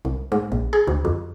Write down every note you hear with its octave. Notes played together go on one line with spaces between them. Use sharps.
C2
G#2
A#1
G#4
D2
F2